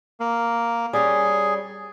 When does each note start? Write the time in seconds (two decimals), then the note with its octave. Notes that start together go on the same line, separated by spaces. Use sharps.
0.20 A#3
0.93 G3 C#4 G#4